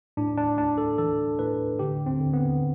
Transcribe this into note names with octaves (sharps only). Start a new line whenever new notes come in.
A2 D4
D4
A2 D4
A4
E3 A4
A2 B4
D3 G4
C4
D3
B3